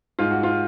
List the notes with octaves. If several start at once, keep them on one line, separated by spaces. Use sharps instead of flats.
G#2 F4
F#4
F4